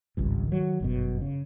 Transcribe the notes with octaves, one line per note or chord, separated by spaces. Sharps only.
G#1 C#2 G2
D#3 F#3
G1 F#2 B2
C#3